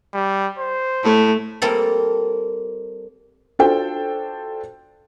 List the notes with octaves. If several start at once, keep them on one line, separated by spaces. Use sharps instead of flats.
G3
C5
A2 A3
G3 A#3 C4 A4
D4 F4 F#4 A4 C5 G5